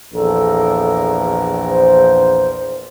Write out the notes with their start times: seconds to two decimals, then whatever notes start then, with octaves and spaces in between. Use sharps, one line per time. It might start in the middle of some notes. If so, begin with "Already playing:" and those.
0.14 A#1 E2 A4 A#4
1.69 C5